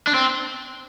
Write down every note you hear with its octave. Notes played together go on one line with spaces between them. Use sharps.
D4
C4